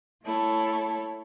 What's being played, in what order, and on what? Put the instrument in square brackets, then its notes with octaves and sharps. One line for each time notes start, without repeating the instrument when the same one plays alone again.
[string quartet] A3 E4 A4 C#5